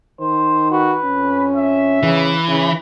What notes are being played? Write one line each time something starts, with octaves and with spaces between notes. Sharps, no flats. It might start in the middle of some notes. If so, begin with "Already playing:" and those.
D#3 C5
F#4 B4
F2 C#4
E5
C#3 E3
C#3 E4